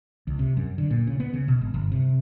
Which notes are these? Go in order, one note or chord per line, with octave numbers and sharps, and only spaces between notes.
C#2
C3
F#2
D3
A#2
C#3
B3
C#3
B2
G#1
G1
C3